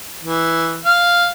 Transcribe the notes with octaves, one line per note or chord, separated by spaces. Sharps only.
E3
F5